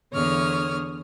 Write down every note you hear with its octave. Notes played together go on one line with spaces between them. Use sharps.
E2 D3 C#5 D#6 F6